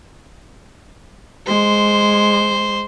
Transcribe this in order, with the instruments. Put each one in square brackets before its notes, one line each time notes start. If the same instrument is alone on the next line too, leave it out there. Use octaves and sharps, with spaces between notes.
[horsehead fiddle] G#3 [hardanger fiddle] C5